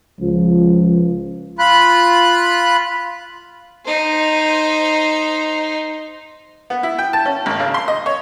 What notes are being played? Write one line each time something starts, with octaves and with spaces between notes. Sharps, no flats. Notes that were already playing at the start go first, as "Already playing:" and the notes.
C#2 F3
F4 B5 F#6
D#4 C5
B3
E4
G5
A5
C#4
G#1
C#3
C6
D#5
C#5